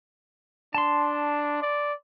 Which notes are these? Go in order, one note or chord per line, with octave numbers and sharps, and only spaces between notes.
D4 A5 C6
D5